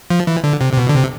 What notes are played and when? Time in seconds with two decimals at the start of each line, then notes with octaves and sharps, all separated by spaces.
0.10 F3
0.27 E3
0.44 D3
0.61 C3
0.73 C3
0.77 B2
0.89 D3
0.94 C3